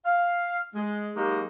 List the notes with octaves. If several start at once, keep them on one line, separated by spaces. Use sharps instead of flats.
F5
G#3
F#3 G#3 A#3 D#4 G4